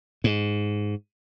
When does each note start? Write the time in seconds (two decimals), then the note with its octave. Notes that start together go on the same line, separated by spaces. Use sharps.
0.24 G#2